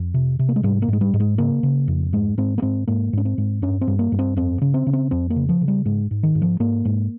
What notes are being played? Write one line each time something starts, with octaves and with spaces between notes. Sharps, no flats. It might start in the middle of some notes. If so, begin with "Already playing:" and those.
Already playing: F2
C3
C3
A#3
G#3
G#2 G3
A#3
G#2 G#3
G3
G#2
G#3
C#3 A#3
C#3
F2
G#2 G#3
G#2 C4
A#3
G#2 C4
G#2 A#3
G#2 C#4
C4
G#2
G2 C#4
C4
G2
A#3
G2
C4
F2 C4
C#3
C4
C#3
C4
F2 C4
A#3
C#3
F3
C#3
G3
G#2 G#3
G#2
D#3
G#2
F3
G#2 A#3
G#2